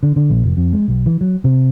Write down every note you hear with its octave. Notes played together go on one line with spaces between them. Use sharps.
D3
D3
A#1
F1
F2
G#3
B1
E3
F#3
C3